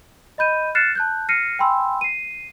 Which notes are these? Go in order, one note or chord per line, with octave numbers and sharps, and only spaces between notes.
D#5 B5 G6 D#7
F6 F#6 A6 C7 C#7 E7
A5 F#6 G6
F6 A#6 C7 C#7 D#7
G5 G#5 B5 C6 E6
C7 D#7